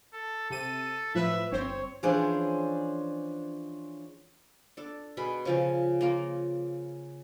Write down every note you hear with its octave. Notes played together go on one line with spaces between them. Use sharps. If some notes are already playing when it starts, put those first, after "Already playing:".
A4
C3 A4 D#7
A2 F3 B4 E5
G1 C4 C5 C#5
E3 F3 C#4 D4 G#4 C5
D4 A4
B2 G#4 B5
C#3 F3 C#4
A#3 F4 A#4